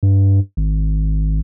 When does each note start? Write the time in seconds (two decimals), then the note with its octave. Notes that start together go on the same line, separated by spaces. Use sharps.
0.03 G2
0.57 G#1